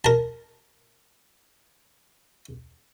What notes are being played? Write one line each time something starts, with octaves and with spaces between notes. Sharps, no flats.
A#4 A5